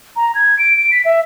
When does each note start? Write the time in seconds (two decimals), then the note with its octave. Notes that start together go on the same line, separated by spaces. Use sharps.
0.16 A#5
0.35 G#6
0.59 D7
0.77 D7
0.92 B6
1.05 E5